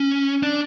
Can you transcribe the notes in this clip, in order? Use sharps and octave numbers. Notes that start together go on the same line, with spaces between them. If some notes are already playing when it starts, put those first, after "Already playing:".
Already playing: C#4
D4